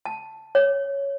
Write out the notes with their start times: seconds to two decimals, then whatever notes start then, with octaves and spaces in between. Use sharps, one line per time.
0.06 A5
0.55 C#5